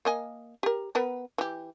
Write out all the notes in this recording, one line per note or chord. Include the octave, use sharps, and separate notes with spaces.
A#3 D#5 G#5
G4 A#4
B3 A#4 B4
E3 G4